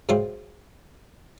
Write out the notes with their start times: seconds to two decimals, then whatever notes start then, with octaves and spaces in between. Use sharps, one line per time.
0.09 G#2 F#3 E4 F4 C5 G5